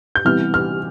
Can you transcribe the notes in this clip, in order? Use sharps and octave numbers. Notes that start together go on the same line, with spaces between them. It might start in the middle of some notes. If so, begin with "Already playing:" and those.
G6
C3 E3 G3 B3 E4 F6
F6